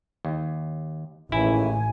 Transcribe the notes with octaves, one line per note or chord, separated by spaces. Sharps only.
D#2
A1 D#2 C#3 E3 E4 G#5